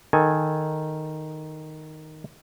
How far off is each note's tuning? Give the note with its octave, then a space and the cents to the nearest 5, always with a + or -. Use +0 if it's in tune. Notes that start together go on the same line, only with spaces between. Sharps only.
D#3 +0 A4 +0 G#5 +0